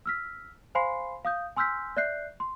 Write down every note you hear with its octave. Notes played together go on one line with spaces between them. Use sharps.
E6 F6 B6
C5 F5 G#5 B5 C6 C7
F5 D#6 G6
G#5 C6 E6 F6 G6 B6
D5 E5 F#6 G6 C7
C6